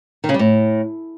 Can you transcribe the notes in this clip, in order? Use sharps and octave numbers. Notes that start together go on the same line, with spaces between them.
D#3
C#3
G3
A2